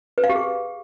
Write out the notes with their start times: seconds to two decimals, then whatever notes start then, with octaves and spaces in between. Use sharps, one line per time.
0.18 B4
0.24 F5
0.29 G4
0.35 G#4